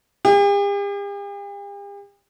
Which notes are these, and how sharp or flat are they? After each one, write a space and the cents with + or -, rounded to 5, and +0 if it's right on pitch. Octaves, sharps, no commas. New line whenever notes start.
G4 +45